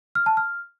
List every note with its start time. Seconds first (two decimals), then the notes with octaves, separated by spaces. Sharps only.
0.15 F6
0.26 A5
0.37 F6